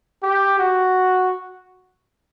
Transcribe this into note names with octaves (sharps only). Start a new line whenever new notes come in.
G4
F#4